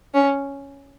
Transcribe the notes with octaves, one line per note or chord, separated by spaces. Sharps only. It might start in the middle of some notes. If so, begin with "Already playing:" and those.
C#4